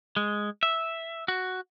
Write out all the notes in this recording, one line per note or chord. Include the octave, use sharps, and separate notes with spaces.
G#3
E5
F#4